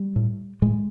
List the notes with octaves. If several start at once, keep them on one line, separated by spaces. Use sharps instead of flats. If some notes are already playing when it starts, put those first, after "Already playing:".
Already playing: G3
A2
A2 G#3